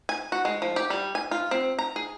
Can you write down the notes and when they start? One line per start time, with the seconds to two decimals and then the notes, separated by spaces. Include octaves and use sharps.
0.09 G#5
0.32 F#4
0.45 G#3
0.62 F3
0.76 G4
0.90 G3
1.15 G#5
1.31 F4
1.51 C4
1.79 A#5
1.96 G#4